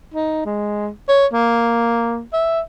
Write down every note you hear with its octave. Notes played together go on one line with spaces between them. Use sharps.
D#4
G#3
C#5
A#3
E5